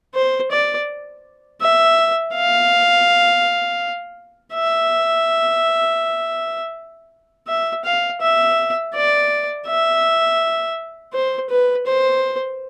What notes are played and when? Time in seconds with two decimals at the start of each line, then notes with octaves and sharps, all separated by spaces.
0.15 C5
0.51 D5
1.62 E5
2.35 F5
4.54 E5
7.48 E5
7.85 F5
8.21 E5
8.95 D5
9.67 E5
11.13 C5
11.50 B4
11.87 C5